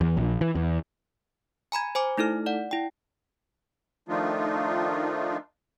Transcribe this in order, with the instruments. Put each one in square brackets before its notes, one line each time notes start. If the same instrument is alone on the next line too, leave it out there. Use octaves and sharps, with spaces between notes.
[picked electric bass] E2
A#1
E3
E2
[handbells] G#5 A#5 B5 G#6
C5 G#5 D6
A3 D#4 E4 A4 F6
D5 F#5
E4 G5
[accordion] D#3 F3 A3 D4 D#4 F4